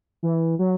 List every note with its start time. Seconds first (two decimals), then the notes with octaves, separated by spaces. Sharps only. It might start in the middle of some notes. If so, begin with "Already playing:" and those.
0.23 E3
0.59 F#3